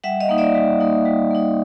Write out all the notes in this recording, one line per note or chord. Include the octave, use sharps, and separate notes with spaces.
G3 E5 F#5
D#5 F5
A#3 D#4
D5 E5
G3
A#3 D#4
G3
A#3 D#4